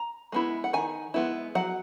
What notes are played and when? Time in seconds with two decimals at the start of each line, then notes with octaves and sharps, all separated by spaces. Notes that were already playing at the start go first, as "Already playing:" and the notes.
Already playing: A#5
0.32 G#3 B3 E4
0.64 F#5
0.73 D#3 G#5
1.14 G#3 B3 E4
1.55 F#3 F#5